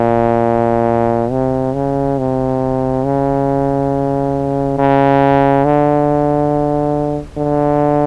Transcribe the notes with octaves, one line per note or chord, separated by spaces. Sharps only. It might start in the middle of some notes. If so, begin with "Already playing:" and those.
Already playing: A#2
C3
C#3
C3
C#3
C#3
D3
D3